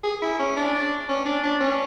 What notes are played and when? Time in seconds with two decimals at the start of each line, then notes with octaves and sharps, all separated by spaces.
0.04 G#4
0.22 E4
0.39 C#4
0.56 D4
1.09 C#4
1.25 D4
1.43 D4
1.60 C#4